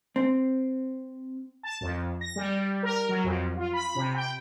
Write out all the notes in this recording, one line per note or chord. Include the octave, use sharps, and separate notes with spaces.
C4
A5
F2
A#6
G3
A#4
F#3
F2
F4
B5
C3
G5